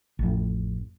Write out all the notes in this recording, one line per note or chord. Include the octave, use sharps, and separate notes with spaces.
A1 F2